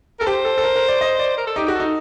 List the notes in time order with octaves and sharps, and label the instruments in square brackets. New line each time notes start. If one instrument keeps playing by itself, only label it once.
[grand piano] A4 [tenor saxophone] A#4
[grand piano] G4 [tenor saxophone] C5
[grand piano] A4
A4
A#4
A#4
D5
D#5
D5
[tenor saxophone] A#4
A4
[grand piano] D#4 [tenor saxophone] G4
[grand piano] F#4 [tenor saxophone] G4
[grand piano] D#4 [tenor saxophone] A4